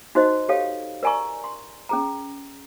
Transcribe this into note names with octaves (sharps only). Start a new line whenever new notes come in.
D#4 F#4 C5 D#5
G4 A4 C#5 F5
A#4 D5 G#5 A#5 C#6
C6
C#4 G#4 A#5